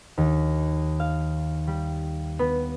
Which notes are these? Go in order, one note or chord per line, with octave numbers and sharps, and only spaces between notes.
D#2
F5
G3
B3